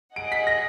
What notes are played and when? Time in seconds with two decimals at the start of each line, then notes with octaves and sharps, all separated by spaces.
0.16 G#4 D#5 F#5 D7
0.32 B6
0.47 A#6